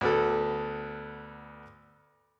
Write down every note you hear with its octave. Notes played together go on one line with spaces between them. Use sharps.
D2 B3 A4